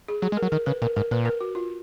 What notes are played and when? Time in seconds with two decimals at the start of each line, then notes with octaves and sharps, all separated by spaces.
0.08 G#4
0.22 F#3 G#4
0.32 G#3
0.37 A#4
0.42 F#3
0.52 D#3 A#4
0.66 C#3 B4
0.82 A#2 A#4
0.96 G#2 A#4
1.11 A#2 B4
1.25 A#4
1.41 F#4
1.55 F4